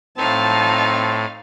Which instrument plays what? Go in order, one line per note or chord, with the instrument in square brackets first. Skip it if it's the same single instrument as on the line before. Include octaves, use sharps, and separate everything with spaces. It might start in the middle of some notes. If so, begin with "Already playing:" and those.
[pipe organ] A2 [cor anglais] C4 [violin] D#4 F5 [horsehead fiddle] A5